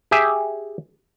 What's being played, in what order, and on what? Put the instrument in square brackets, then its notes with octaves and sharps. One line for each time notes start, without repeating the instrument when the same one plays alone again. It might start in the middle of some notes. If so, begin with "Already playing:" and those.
[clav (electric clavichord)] G4 G#4 E5 G#5